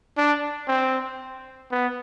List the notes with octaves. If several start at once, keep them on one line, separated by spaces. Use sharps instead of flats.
D4
C4
B3